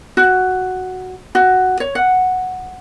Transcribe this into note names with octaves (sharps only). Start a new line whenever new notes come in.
F#4
F#4
C#5
F#5